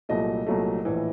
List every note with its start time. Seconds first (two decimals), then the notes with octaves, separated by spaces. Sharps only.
0.09 C2 A#2 F#3 A3 D#5
0.47 C2 A#2 F#3 A3
0.85 A#1 A2 E3